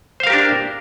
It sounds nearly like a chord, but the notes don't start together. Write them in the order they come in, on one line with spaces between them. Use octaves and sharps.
C5 F5 A#4 G4 D4